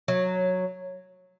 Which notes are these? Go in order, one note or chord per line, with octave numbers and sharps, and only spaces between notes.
F#3